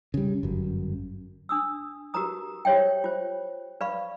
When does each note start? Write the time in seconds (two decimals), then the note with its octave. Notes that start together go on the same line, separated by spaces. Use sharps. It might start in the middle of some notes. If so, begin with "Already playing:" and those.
0.14 C#3 G3
0.43 G1 F#2
1.49 D4 D#6 E6
2.14 F#4 G4 A#4 B4 A#5 D#6
2.65 G4 C5 C#5 E5 G5
3.04 F4 C5
3.81 B4 D5 F5 B5 C#6